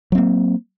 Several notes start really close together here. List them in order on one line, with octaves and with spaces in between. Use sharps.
F#3 C4 A#3